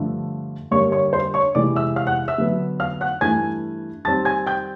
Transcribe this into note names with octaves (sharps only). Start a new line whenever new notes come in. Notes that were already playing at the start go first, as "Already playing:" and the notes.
Already playing: G2 D3 F3 A3
G2 D3 G3 A#3 C#5 C#6
C#5 C#6
C5 C6
C#5 C#6
C3 E3 G#3 D5 D6
E5 E6
F5 F6
F#5 F#6
E5 E6
D3 F#3 B3
F5 F6
F#5 F#6
G2 E3 A3 G#5 G#6
D#3 G3 C4 A5 A6
G#5 G#6
G5 G6